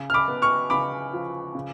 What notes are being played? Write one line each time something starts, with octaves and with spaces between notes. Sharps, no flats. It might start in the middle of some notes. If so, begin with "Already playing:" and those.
Already playing: C#3
F6
B5 D6
B3
C#6 F6
C#3 B5 D6
F3
C#3